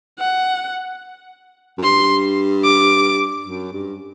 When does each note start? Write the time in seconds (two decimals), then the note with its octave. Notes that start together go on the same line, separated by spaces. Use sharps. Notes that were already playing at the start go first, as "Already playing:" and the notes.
0.19 F#5
1.78 F#2
1.83 G2 C6
2.64 D6
3.45 F#2
3.72 G2